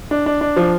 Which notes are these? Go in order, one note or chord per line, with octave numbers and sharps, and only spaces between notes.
D4
D4
D4
F3